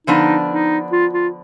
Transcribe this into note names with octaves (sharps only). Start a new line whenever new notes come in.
D3 F3 B3 D4 D#4
D#4
F4
F4